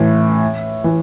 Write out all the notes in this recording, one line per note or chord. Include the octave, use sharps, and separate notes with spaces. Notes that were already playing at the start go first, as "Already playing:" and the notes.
Already playing: A2 E3
E3